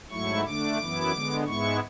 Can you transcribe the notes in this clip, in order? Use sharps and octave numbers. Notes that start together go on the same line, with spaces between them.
G#2 F#3 A3 E4 C#6
D3 A3 D4 D6
F#2 E3 B3 E4
D3 G#3 B3
G#2 G#3 B3 E4 C#6